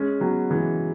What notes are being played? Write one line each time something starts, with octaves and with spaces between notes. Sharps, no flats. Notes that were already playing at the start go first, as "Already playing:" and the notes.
Already playing: G#3 C#4
F#3 B3
E3 G#3